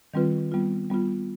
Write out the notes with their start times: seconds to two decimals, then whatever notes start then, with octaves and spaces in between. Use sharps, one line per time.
0.14 D#3 G3 C4 F4 B4
0.52 G3 B3 F4
0.90 G3 B3 F4